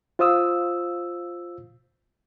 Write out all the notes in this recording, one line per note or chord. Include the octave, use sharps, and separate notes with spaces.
F4 C5 F5 D#6 E6